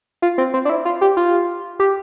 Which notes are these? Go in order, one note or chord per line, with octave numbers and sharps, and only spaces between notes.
F4
C4
C4
D4
E4
F4
G4
F4
G4